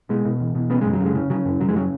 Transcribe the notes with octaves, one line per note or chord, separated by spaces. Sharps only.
B2 G#3
B2
E2
B2
C#3 B3
F#2 G#3
F#3
C#3 G#3
C#3
C#3 F#3
F#2
F#2 F#3
G#3
C#3 F#3